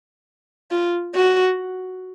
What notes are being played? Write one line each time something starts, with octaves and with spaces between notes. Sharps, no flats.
F4
F#4